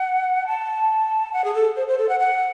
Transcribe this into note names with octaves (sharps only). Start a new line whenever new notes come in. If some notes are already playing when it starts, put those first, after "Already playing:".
Already playing: F#5
A5
F#5
G#4
A4
C5
C5
A4
F#5
F#5